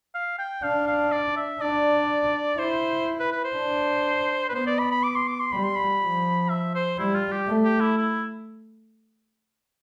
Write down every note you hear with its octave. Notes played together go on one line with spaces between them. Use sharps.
F5
G5
D4 F5
F5
D5
E5
D4 D5
E4 C5
B4
B4
C5
D4
B4
B3 C5
D5
B5
B5
D6
C6
D6
C6
G3 B5
C6
B5
F3
E5
C5
G3 E4
F4
G4
A3
G4
E4
E4